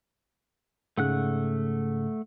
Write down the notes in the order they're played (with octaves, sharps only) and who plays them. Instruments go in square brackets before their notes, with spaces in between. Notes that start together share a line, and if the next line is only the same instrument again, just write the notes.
[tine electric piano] G#2 C#3 [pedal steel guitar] A3 F#5 F#6